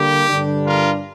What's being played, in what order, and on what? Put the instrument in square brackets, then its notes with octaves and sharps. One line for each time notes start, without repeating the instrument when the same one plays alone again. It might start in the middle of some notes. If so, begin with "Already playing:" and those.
Already playing: [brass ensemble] D3 G3 A#3 G4
G2 D3 G3 D4
F4 A#4